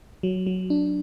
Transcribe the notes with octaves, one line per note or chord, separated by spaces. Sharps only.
F#3
F#3
D4